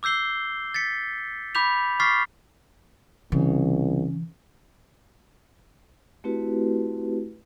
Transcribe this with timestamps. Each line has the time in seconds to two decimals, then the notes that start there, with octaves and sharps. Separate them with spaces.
0.03 D6 E6 G6 C7 G7
0.74 A6 B6 C#7
1.55 B5 D6 G6 B6 F7
2.00 C#6 D6 F6 A6 B6 C7
3.32 C2 C#3 E3
6.24 A3 C4 E4 F#4 G4 B4